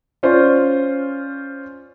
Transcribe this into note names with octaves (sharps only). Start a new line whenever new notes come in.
C#4 F4 C5 D5